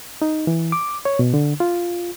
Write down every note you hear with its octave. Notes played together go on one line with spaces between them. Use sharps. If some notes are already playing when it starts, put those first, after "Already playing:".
D#4
E3
D6
C#5
B2
D3
F4